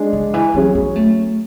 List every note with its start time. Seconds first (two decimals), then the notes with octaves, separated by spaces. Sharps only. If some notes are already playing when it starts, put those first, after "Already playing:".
Already playing: G#3 D4 G#4
0.13 D3
0.34 E3
0.54 E3 F#3 C#4 G#4
0.75 B3
0.96 A3